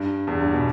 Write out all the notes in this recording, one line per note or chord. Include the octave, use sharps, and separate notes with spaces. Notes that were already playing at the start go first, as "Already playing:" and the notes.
Already playing: G2
E2
G2
B2